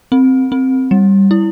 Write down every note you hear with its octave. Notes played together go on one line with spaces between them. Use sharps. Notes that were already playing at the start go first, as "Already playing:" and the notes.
C4
C4
G3
E4